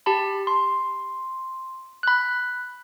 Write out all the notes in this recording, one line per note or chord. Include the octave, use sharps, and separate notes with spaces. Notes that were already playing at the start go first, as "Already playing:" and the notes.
G4 A5 B5
C6
B5 F#6